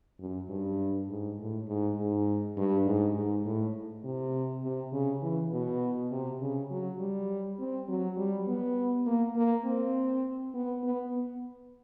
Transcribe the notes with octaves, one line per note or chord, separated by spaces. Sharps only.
F#2
G2
G#2
A2
G#2
G#2
G2
G#2
G#2
A2
C3
C3
C#3
E3
B2
C3
C#3
F#3
G3
C4
F#3
G3
B3
A#3
A#3
C4
B3
B3